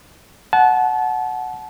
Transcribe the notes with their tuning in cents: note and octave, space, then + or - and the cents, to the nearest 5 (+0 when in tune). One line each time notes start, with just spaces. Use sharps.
F#5 +0 A5 -30